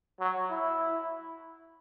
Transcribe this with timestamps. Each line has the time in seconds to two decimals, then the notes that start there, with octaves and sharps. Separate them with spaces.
0.20 F#3
0.51 E4